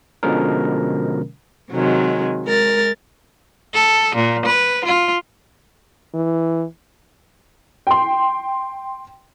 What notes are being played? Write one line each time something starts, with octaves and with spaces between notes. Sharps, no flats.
B2 D3 F3 G#3 C#4 A#4
C3 D#3 F#3 G#3
G#3 A#4 A6
A4
A#2
B4
F4
E3
G5 C6